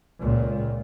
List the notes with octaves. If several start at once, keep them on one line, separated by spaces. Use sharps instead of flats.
C#2 A#2